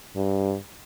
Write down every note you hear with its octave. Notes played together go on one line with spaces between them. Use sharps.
G2